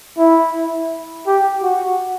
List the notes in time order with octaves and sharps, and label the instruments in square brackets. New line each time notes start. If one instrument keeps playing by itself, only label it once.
[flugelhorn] E4
G4
F#4